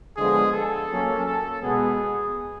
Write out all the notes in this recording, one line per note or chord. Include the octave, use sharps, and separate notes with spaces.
D3 F3 G#3 B3 G#4
A4
F#3 A#3 C#4
A4
B2 G#3 B3 G#4